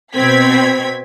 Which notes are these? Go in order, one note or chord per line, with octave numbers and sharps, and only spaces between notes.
B2 C4 G#6 B6